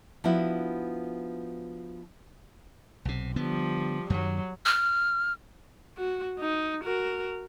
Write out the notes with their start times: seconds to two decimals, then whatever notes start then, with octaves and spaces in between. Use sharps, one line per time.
0.24 F3 B3 D4 E4 F#4
3.05 B1 C3
3.36 D3 F3 G3 B3
4.10 F#2 D#3 F#3
4.66 F6
5.98 F#4
6.39 D#4
6.84 F#4 A#4